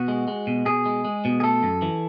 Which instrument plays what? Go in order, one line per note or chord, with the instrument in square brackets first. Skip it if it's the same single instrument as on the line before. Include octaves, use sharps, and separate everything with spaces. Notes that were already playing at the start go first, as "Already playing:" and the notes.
Already playing: [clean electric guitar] B2 F#4
G#3
G#3
B2
B2 G#4
G#3
G#3
B2
G#4
A3 A4
F#2
E3